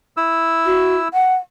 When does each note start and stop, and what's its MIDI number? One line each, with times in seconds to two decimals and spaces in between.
0.17 1.08 64
0.17 1.08 88
0.66 0.96 66
1.14 1.35 78